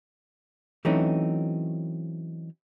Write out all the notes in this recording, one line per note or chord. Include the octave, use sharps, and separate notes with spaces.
E3 F#3 A3 C4 C#4 D#4